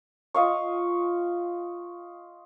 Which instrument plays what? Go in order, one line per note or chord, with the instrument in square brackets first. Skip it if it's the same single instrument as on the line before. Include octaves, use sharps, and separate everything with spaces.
[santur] F4 D#5 F5 C#6